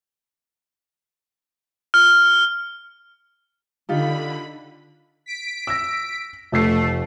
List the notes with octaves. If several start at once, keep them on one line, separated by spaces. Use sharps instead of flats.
F6
D3 D#4 F4 G4 B5
B6 D7
E6 A#6
F1 A3 E6 C7